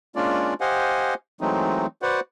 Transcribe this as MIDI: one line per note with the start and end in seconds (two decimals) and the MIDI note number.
0.16 0.54 56
0.16 0.54 58
0.16 0.54 61
0.16 0.54 62
0.16 0.54 65
0.16 0.54 74
0.61 1.14 67
0.61 1.14 72
0.61 1.14 75
0.61 1.14 77
0.61 1.14 78
0.61 1.14 80
1.41 1.86 52
1.41 1.86 54
1.41 1.86 56
1.41 1.86 57
1.41 1.86 60
1.41 1.86 63
2.02 2.20 66
2.02 2.20 71
2.02 2.20 72
2.02 2.20 74
2.02 2.20 78